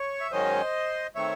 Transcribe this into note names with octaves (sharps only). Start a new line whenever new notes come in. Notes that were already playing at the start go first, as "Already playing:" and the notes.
Already playing: C#5
E5
G#2 D#3 F#3 C#4 C5 D#5
D#3 A3 C4 C#5 E5